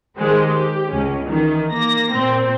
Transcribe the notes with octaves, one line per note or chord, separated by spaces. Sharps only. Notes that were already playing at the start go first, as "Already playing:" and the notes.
D#3 G#3 G4 C5
G4
C#2 C#4
D#3 E3
A#3 A#6
A#2 C4